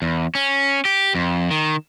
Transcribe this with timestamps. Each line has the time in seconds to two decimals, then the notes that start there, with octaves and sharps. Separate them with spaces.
0.02 E2
0.35 C#4
0.85 G4
1.14 F2
1.51 D#3